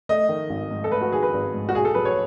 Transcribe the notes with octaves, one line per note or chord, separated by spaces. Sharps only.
A3 D#5
D#3
G#1
G#2
A4
A3 B4
F#4
D#3 G#4
B4
G#1
G#2
F#4
B1 G#4
A4
F#3 B4
C#5